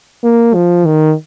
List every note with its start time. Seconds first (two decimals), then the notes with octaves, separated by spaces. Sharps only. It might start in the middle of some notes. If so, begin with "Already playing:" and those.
0.24 A#3
0.55 F3
0.85 D#3